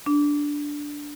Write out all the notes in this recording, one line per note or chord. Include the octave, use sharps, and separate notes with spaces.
D4